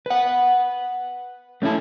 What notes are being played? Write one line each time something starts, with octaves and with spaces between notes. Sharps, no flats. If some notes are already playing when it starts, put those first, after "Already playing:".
B4 F#5
A3 C#4 D#4 E4 A4